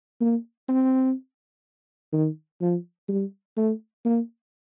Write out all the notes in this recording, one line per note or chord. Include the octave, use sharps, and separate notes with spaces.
A#3
C4
D#3
F3
G3
A3
A#3